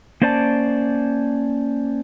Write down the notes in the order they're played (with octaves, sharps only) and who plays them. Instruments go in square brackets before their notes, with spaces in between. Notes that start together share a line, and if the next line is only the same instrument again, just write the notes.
[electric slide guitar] A#3 C#4 C5 D5 G#5 A5